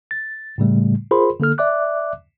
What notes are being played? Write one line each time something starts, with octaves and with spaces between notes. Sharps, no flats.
A6
A2 C#3 G3 A3
F4 G#4 A#4 C5 B5 C6
D3 A#3 A4 F6
D5 E5 D6 F#6